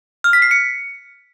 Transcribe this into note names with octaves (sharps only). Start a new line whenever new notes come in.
F6
B6
C7
C#7